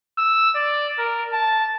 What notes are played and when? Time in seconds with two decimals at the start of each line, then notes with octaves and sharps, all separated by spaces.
0.18 E6
0.55 D5
0.98 A#4
1.32 A5